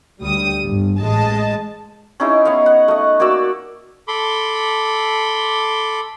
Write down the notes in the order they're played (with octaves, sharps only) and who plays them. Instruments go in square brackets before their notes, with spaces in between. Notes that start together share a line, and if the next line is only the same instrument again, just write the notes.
[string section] D2 G3 D#6
G1
A1 G#3 D#5 A5
[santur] C#4 D#4 E4 G#4
B3 C#5 D#5 F5
F#5
A3 D#5
A#3 F#4 D5 E6
[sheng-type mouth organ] A4 B5 C6 D6